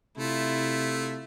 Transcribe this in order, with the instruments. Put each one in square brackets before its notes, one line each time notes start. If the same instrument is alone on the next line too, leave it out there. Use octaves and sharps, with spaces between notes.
[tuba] C3 [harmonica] A3 [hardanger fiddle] E4 F4